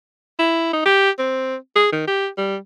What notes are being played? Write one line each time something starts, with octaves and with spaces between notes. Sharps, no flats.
E4
D#4
G4
C4
G#4
D#3
G4
G3